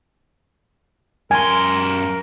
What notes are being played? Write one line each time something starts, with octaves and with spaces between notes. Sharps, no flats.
F#2 A#4 G#5 C6